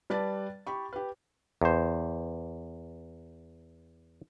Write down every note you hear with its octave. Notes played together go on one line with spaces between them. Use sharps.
G3 B4 D5 A5 A6
G4 B5 C#6
G4 B4
E2 C5